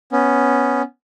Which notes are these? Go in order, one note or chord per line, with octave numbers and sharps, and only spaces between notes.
B3 C#4